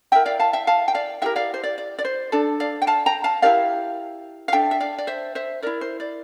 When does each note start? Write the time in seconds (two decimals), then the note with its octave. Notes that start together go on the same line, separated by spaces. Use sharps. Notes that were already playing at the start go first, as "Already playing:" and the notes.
0.12 E4 A#4 E5 G5
0.26 D5 F5
0.39 F5 A5
0.53 E5 G5
0.67 F5 A5
0.88 G5
0.95 D5 F5
1.22 E4 G4 A#4 E5 G5
1.36 D5 F5
1.54 C5
1.63 D5
1.78 D5
1.99 D5
2.05 C5
2.32 D4 A4 D5
2.60 D5 F5
2.82 G5
2.87 F5 A5
3.06 G5 A#5
3.24 F5 A5
3.42 E4 G4 A#4 D5 F5
4.48 F5
4.52 D4 A4 E5 G5
4.71 E5
4.80 D5 F5
4.98 D5
5.07 C5 E5
5.35 C5 E5
5.63 E4 A#4 D5
5.81 C5
6.00 D5